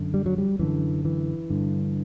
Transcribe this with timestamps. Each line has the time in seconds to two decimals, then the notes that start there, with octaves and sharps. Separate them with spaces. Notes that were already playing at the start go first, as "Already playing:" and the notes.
Already playing: F#2 D3
0.14 G3
0.26 F#3
0.38 G3
0.59 F#2 D3 E3
1.05 E3
1.50 G2 D3